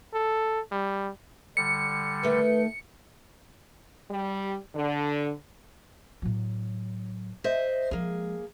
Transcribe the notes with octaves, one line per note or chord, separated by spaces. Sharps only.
A4
G3
D3 G3 C#7
D#3 A3 B4
G3
D3
A2 F#3
C5 D#5 E5
F3 G#3 A#3 G#4